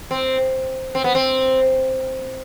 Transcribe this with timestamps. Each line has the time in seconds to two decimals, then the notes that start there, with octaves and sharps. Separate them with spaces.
0.11 C4
0.95 C4
1.04 B3
1.15 C4